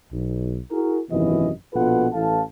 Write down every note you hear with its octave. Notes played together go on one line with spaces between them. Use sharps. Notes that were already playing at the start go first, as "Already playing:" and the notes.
B1
E4 F#4 G#4 A#4
G#1 F#2 C3 E3 B3 D#5
A#1 B2 F4 A4 B4 F#5
A1 E3 A4 F5 A5